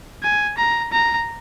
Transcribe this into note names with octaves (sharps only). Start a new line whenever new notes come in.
G#5
A#5
A#5